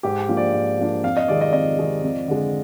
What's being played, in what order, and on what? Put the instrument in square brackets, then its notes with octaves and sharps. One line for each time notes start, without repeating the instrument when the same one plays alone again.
[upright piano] G#2 [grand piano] G4
[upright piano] F3 A#3 D4 F4
[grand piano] D5
[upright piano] G#2
F3 A#3 D4 F4
[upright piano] F2 [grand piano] F5
[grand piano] D#5
[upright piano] C3 D#3 G#3 [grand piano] D5
[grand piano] D#5
[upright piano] F2 [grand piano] D#5
[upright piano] C3 D#3 G#3
F2
D3 G#3